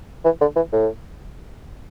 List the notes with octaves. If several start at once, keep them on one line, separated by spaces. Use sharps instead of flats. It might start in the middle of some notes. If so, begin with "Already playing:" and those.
E3
D3
E3
A2